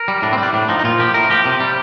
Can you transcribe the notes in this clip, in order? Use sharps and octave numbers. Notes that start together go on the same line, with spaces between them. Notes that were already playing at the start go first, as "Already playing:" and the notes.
Already playing: A#4
G3
A2 D4
C4
G3 D4
A2 D4
F3 D#4
D#4
A#2 F4
F3 G4
A2 A#4
F3 G4
C3
G3